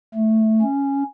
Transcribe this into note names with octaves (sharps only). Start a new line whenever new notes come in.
A3
C#4